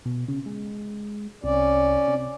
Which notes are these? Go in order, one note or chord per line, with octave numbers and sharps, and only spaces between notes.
B2
C#3
G#3
C2 C#4 D5
C3